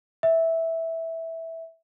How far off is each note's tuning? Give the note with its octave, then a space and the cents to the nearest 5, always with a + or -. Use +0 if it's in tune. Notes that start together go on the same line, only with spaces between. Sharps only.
E5 -10